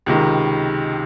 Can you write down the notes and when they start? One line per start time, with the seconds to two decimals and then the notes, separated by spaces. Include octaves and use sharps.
0.06 C#2 C3 D#3